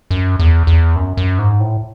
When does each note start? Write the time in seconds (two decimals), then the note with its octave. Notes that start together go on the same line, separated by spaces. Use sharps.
0.11 F#2
0.39 E2
0.67 E2
0.96 F#2
1.17 F#2
1.39 G#2
1.60 A2